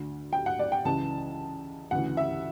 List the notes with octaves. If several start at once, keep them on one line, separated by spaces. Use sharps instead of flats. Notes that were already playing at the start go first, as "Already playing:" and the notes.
Already playing: D2 D3
G5
F#5
D5
G5
C#2 C#3 E3 A5
D2 C#3 E3 F#5
E5